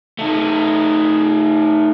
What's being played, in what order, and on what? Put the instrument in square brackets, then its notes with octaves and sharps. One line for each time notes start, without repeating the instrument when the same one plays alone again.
[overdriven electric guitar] A3 D#4